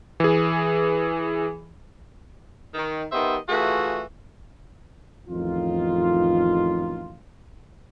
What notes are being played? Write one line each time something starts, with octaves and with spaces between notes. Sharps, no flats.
E3 G#4
D#3
D#3 B3 G4 C5 D#5 E5
E3 A3 F4 F#4 G#4
A1 F2 D#3 D#4 F4